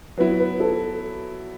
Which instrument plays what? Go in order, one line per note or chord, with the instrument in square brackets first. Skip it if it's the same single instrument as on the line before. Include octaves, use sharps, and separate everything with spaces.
[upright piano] F#3 B3 E4 [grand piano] B4
[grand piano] B4
A4